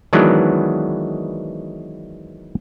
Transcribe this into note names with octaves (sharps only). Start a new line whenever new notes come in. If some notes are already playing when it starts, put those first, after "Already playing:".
D#3 E3 F#3 G#3 B3 D4